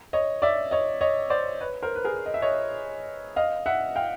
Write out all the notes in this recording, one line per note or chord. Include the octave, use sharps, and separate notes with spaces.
C#5 D#5
D5 E5
C#5 D#5
C#5 D#5
C5 D5
B4 C#5
A#4 C5
B4
G#4 A#4
D#5
E5
C#5 D#5
D#5 F5
E5 F#5
F5 G5